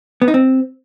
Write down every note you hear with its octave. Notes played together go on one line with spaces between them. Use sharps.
B3
D#4
C4